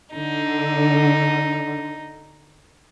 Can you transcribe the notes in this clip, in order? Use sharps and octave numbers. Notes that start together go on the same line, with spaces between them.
D3 D#4